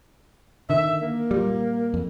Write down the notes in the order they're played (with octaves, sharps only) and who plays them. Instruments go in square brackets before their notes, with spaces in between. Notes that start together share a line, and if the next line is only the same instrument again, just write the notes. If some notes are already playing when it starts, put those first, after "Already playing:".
[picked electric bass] D3 D#3 [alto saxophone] E5
[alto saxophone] A#3
[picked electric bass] A#2 G3
F2